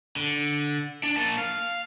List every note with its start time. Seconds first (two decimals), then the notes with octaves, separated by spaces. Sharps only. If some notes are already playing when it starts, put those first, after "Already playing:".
0.16 D3
1.03 D4
1.16 A#3 A5
1.38 F5